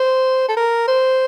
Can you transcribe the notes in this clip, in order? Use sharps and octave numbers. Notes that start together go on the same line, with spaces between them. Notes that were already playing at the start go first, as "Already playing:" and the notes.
Already playing: C5
A4
A#4
C5